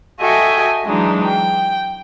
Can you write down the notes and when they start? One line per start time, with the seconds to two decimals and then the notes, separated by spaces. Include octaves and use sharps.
0.19 F#4 A4 D#5 E5 G5 G#5
0.84 E3 F#3 G#3 D4 D#4
1.25 G5